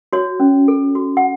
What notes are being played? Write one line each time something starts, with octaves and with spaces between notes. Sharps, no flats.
F#4 C#5
C#4
A4
F#4
F#5